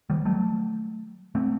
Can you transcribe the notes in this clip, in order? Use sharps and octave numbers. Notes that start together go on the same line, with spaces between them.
D#3 G3
F#3 A3
A3 C4